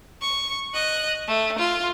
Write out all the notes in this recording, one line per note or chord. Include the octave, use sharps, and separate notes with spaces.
C#6
D#5 F#6
A3
F4